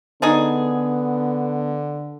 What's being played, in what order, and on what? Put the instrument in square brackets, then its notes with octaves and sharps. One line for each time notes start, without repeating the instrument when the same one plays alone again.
[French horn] D3 [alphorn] B3 [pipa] D4 D#4 G#4